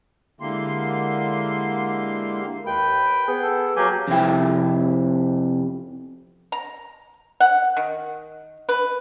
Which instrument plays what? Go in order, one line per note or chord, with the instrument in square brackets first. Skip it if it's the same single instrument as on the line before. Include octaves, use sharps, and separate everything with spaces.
[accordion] D3 A#3 C6 [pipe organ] G#3 E4 G4
[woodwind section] D#2 [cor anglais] B4 [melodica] G5
[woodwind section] B3 G#4
[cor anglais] A4
[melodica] F#3 G4 G#5 [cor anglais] A#3
[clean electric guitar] F2 C3 E4 G5
[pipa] A#5
F#5
D#3
B4